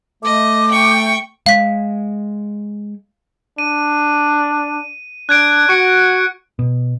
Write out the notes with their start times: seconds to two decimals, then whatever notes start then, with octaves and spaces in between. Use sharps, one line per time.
0.23 A3 D#5 D6
0.71 G5 C#6
1.46 G#3 F5 B6
3.58 D4 D#7
5.29 D4 F#6 G#6 D7
5.69 F#4 C#6 C#7
6.59 B2